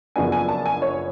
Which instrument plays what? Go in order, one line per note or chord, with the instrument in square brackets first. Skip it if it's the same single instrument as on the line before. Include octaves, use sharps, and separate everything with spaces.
[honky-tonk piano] F#1 F#2 F3 B3 D4 G#5
G#5
A5
G#5
C#5